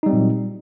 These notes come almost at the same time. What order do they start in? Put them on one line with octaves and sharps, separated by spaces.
D#4 G3 C4 A#2 F#3